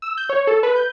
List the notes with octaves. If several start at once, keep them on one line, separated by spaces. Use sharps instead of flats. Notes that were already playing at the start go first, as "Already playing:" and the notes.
E6
G6
C#5
A4
B4
G6